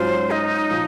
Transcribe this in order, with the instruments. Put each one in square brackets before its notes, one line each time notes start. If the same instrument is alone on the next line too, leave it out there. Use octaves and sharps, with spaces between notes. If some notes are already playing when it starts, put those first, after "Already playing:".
Already playing: [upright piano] G#2 F#3 C#4 F4 [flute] C5
[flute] D#4
[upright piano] A#2 F3